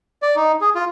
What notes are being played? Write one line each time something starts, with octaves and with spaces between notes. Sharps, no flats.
D5
D#4
G#4
F4